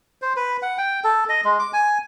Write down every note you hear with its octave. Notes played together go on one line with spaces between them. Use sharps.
C5
B4
F#5
G5
A4
D#5
G#3
D6
G#5